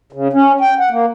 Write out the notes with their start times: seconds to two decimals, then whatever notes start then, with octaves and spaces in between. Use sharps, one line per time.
0.13 C#3
0.33 C#4
0.61 G5
0.79 F#5
0.91 A#3